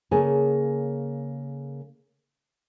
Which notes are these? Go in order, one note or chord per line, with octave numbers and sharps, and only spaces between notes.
C#3 A#3 G#4 A4 C#5 G#5